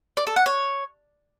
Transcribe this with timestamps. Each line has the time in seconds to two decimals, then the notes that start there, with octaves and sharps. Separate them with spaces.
0.17 D5
0.27 A4
0.36 F#5
0.46 C#5